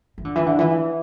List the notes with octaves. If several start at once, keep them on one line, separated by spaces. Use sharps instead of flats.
E3
D3
E3
D3
E3